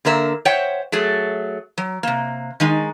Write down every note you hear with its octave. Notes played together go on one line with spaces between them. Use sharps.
D3 A#3 A#4 E5
C5 C#5 E5 F#5 G5
F#3 A3 G#4
F#3
C3 A#3
D#3 G#3 D#4